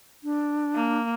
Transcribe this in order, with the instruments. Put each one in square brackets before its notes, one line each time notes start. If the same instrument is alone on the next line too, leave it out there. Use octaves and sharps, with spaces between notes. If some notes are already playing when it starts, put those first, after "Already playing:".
[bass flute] D4
[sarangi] A#3